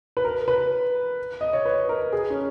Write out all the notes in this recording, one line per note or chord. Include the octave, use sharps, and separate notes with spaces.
B4
A#4
B4
D#5
C#5
B4
A#4
G#4
C#4